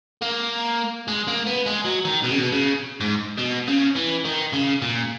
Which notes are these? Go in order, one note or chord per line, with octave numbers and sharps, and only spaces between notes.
A#3
G#3
A#3
B3
G#3
F#3
D#3
B2
C#3
B2
C#3
G#2
B2
C#3
E3
D#3
C#3
A#2